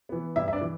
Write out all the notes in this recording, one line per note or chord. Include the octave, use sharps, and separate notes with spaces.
E3 B3
G2 E4 E5
E5
D4 D5
E3